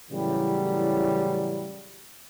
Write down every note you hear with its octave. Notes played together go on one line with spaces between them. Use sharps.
A2 C#3 E3 F#3 G3 A3